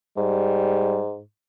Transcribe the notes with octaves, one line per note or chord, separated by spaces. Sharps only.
G#2 G3